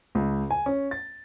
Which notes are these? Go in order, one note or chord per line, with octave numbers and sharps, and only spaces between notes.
C#2
G#5
C#4
A6